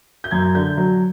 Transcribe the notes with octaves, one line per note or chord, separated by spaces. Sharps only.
G6
F#2 G#6
D3 G6
F#3